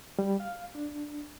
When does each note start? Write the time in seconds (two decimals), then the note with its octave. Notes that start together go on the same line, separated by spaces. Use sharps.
0.19 G3
0.40 F5
0.75 D4